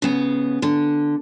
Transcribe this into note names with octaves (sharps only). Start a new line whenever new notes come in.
C#3 B3
D3